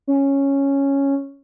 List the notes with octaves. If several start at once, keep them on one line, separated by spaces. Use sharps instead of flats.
C#4